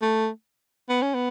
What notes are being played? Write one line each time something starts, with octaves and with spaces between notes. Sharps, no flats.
A3
B3
C#4
B3